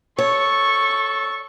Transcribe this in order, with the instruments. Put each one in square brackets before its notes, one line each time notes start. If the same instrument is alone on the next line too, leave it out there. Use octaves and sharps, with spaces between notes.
[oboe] A4 [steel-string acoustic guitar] C#5 [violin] C#6